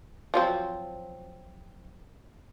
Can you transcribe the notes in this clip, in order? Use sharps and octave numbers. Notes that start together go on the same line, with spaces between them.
F3 F#3 C4